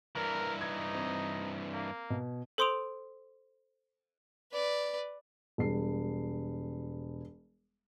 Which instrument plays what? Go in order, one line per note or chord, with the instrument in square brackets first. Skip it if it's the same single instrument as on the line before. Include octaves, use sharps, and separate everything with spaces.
[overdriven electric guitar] G2 E3 [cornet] A#4
[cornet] D#4 [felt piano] G#6
[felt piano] C4
[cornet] A#3
[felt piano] B2
[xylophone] A4 C5 C6 D#6 D7 F7
[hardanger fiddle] B4 D5
[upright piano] E1 G3 C7